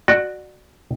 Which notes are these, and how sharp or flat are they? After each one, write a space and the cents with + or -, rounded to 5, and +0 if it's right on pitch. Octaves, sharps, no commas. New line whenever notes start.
F#4 +0 D5 +25